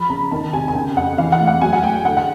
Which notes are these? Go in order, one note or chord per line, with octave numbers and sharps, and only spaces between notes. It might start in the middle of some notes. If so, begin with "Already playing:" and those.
Already playing: F3 B5
C#3 A#5
D#3 A5
C3 G#5
G#5
C#3 G5
F2 F#5
E3 F5
F#5
A2
F#5
F#3 G#5
F#5
A2 G5
D3 F#5
F#5